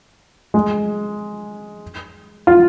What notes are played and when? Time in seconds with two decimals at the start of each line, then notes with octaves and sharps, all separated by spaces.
0.54 G#3
2.47 F4